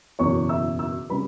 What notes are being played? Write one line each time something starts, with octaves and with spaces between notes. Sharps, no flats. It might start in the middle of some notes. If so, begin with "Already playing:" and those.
F#1 E2 B2 C#5 C#6
E5 E6
E5 E6
C#3 G3 B4 B5